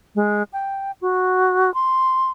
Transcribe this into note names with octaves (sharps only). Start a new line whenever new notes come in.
G#3
G5
F#4
C6